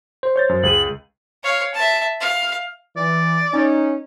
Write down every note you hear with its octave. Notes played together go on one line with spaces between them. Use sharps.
C5
C#5 G6 A6
F#2
C#2 G#4 D#7 F#7
C#5 F5
E5 A5
F5
E3 D5
C#4 D#4